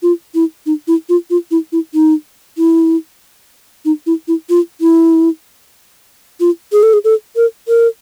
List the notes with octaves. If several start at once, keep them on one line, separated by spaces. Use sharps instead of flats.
F4
E4
D#4
E4
F4
F4
E4
E4
D#4
E4
D#4
E4
E4
F4
E4
F4
G#4
A4
G#4
A4
A#4
A#4